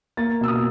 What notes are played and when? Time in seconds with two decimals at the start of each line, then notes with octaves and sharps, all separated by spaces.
0.17 A#3 A6
0.41 B2 E6
0.48 D#6